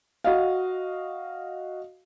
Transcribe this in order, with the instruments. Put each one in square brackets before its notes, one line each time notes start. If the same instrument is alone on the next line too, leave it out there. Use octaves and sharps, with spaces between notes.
[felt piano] F#4 D#5 F5